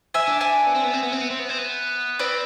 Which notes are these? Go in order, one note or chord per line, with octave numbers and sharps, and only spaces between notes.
E5 G#5
D4
E5 G#5
B3
C4
B3
C4
B3
C4
B3
C4
B3
C4
B3
C4 B4 D5